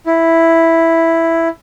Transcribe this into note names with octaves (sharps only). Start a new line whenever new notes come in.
E4